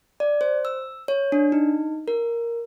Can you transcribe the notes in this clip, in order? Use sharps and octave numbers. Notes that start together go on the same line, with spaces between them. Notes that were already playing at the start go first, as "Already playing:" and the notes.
D5
C5
E6
C#5
D4
D#4
A#4